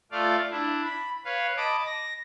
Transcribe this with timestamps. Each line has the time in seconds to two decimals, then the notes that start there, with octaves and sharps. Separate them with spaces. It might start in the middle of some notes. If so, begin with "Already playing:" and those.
0.12 A3 F4 D5 F5
0.50 D4 E4
0.85 B5
1.25 B4 C#5 F5
1.57 D#5 A5 B5 D6
1.86 A#6